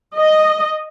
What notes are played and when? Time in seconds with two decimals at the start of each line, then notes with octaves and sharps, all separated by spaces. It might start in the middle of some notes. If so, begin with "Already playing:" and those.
0.16 D#5